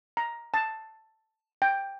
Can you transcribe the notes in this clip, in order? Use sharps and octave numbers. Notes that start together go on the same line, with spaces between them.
A#5
A5
G5